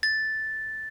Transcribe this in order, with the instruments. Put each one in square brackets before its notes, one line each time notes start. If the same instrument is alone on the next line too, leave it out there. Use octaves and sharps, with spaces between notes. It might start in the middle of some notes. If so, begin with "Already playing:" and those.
[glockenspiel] A6